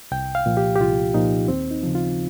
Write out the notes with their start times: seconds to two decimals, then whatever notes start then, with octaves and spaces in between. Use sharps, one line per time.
0.11 C2 G5
0.35 F5
0.46 A#2 F3
0.57 G4
0.76 G4
0.80 C2 F4
1.14 A#2 F3 D#4
1.48 D#2 C4
1.71 D#4
1.83 C#3 F3
1.95 F4